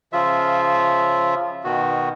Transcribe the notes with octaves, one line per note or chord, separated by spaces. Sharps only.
C#3 F3 F4 E5
B2 D#3 F#4